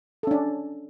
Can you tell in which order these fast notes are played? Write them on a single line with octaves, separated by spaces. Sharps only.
A4 C#4 D4